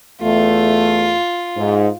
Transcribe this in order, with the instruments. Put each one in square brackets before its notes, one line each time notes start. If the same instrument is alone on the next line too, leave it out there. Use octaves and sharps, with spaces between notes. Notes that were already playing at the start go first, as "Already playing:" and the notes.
[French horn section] E2 A3 [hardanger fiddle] F4
[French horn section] G#2